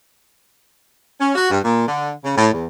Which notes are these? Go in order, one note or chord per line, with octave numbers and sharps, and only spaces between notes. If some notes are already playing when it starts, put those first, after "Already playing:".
C#4
F#4
G2
A#2
D3
C#3
A2
E2